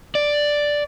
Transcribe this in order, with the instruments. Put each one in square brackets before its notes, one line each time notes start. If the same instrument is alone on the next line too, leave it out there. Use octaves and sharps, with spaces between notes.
[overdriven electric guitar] D5